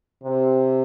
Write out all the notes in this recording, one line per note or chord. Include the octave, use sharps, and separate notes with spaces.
C3